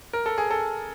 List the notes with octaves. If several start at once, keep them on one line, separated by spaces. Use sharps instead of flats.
A#4
A4
G#4
A4